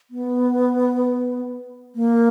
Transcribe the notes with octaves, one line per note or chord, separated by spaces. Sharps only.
B3
A#3